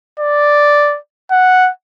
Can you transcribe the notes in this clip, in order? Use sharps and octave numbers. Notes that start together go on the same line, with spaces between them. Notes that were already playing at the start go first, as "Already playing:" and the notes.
D5
F#5